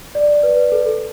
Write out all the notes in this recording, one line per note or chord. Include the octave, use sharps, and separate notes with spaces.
D5
B4
A4